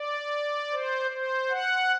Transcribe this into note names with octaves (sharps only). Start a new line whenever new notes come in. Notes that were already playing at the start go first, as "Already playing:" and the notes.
Already playing: D5
C5
C5
F#5